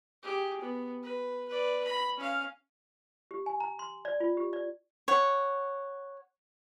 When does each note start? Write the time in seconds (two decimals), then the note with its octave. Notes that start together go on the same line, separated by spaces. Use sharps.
0.23 G4 G#4
0.61 B3
1.03 B4
1.48 B4 D5
1.85 B5
2.17 C#4 F5
3.31 G4
3.46 G#5
3.60 A#5
3.79 C6
4.05 D5
4.20 F4
4.37 G4
4.53 D5
5.08 C#5 F#5